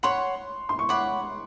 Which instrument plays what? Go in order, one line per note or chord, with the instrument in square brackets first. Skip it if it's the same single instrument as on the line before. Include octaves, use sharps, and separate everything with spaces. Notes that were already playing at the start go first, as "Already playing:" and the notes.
[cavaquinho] C#5 F#5 B5 [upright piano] C6
[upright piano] C6
C#6
[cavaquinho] C#5 F#5 B5 [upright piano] D6